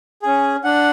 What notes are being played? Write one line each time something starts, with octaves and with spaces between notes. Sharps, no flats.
C#4 G#4
D4 F#5